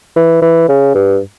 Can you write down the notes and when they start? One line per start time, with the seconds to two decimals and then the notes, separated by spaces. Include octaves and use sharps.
0.16 E3
0.42 E3
0.68 C#3
0.94 G2